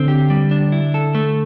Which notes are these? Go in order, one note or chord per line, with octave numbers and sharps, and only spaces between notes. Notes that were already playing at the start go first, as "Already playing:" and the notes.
Already playing: D3 C4
G4
G3
D4
E4
A4
A3